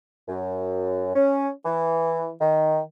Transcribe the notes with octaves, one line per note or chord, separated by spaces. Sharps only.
F#2
C#4
E3
D#3